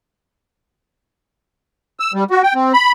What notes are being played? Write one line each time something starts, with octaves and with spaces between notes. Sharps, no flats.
E6
G3
F#4
G5
C4
B5